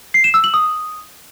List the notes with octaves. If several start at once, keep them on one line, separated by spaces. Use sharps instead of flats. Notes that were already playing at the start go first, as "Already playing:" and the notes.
C7
E7
E6
F#7
D#6